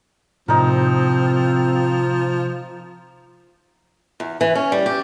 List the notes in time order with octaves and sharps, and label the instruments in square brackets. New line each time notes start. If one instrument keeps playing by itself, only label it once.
[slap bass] A2 C3 [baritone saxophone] F3 [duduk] C4 [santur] D#4 A#4
[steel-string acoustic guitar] E2
E3
C#4
G3
G4